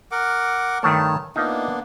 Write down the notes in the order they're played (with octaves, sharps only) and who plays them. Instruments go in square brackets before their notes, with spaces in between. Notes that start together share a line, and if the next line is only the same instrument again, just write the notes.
[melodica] A#4 F#5 D6
[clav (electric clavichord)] G2 D#3 A3 [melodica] C#5 A5
[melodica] A#3 B3 D4 [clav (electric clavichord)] D#4 F4 E5